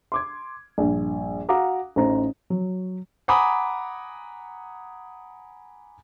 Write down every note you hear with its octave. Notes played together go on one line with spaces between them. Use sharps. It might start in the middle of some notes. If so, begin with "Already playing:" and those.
C6 D6 G#6
A#1 G2
F#4 F5 F#5 A#5 D6 D#6
A1 D#4 C5 A#5
F#3
F#5 G#5 A#5 B5 D6 D#6